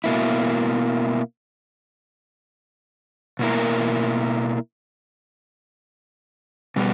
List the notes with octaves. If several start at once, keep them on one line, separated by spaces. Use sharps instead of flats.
B2 A#3 E4
B2 A#3 E4 A#4
B2 G3 B3